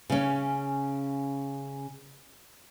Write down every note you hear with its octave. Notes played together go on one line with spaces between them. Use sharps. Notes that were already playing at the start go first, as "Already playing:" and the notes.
C#3 C#4